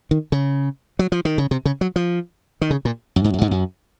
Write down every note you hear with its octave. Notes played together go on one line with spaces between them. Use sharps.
D#3
C#3
F#3
F3
D#3
C#3
C3
C#3
F#3
F3
D#3
C#3
A#2
F#2
G#2
F#2
G#2
F#2